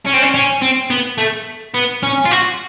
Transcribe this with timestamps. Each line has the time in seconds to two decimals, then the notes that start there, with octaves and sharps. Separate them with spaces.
0.06 C#4
0.13 C4
0.23 C#4
0.34 C#4
0.62 C4
0.90 B3
1.18 A3
1.74 B3
2.03 C#4
2.25 F4
2.31 F#4